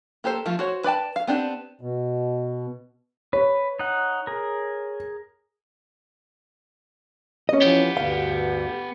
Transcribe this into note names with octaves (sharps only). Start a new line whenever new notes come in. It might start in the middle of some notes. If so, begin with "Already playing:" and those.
A#3 G4 A4 C5
F3 A3 F4
F#4 C5 C#5
B4 D5 G5 A5
F5
B3 C4 D4 G4
B2
B4 C#5
D#4 F#5
G#4 A#4
C#4 D#5
E3 F3 B3 G4
D2 G2 D3 F5